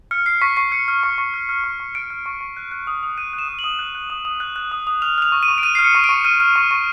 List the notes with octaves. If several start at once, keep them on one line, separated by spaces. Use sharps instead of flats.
F6 C#7
F6 C7
C#6 B6
C#6 C7
F6 C#7
F6
C#6
C#6
F6
F6
C#6
C#6
F6 D7
F6
C#6
C#6
F#6
F#6
D#6
D#6
F#6 D#7
F#6
E7
D#6
F#7
D#6
F#6
F#6
D#6
D#6
F#6
F#6
D#6
D#6
F6 F7
F6 F7
C#6
D#7
C#6
D7
F6 D#7
F6 C7
C#7
C#6
D7
C#6
F6 D#7
F6
C#6
C#6